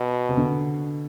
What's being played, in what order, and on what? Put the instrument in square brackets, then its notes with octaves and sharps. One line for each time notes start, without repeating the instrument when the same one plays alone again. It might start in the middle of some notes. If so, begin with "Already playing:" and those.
Already playing: [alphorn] B2
[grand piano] C3
D3